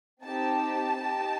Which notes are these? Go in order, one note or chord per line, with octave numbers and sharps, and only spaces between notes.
C4 D#4 G4 A5
D#4 G4